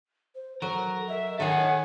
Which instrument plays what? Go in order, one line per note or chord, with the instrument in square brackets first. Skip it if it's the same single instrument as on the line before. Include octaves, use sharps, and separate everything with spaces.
[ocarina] C5
[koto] F#3 [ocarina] A4 [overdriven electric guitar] A#4
[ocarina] D#5 [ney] E5
[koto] D#3 G#4 [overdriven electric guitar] A4 G#5 [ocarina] C#5 [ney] F#5